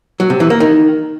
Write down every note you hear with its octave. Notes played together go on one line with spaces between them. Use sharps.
F#3
C3
E3
A#3
D#3